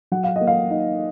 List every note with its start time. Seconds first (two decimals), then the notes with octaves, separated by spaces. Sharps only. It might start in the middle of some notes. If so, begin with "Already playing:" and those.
0.12 F#3 F#5
0.24 F5
0.36 D#5
0.41 A#3
0.47 F5
0.71 D#4